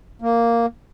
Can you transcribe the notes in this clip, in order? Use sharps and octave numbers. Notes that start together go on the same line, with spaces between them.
A#3